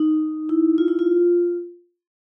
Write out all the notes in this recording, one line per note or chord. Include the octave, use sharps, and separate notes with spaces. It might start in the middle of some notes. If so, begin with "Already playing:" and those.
Already playing: D#4
E4
F4
E4
F4